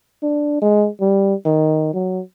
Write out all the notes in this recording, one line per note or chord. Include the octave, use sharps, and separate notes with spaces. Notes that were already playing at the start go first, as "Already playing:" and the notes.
D4
G#3
G3
D#3
F#3